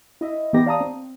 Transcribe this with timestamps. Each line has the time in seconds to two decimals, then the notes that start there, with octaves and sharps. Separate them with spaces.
0.21 E4 D#5 E5
0.53 E3 B3 D#4 G4 A#6
0.66 D5 F5 A5 A#5 D#6
0.81 C4